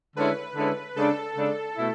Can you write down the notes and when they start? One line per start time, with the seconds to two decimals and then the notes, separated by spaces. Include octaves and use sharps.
0.16 D3 G#3 C#4 E4 B4
0.56 D3 G#3 C#4 E4
0.96 C#3 G#3 D4 A4
1.36 C#3 G#3 D4
1.76 B2 A3 E4